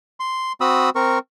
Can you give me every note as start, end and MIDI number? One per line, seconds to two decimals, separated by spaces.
0.20 0.52 84
0.61 0.90 60
0.61 0.90 66
0.61 0.90 83
0.61 0.90 87
0.61 0.90 88
0.95 1.19 60
0.95 1.19 70
0.95 1.19 85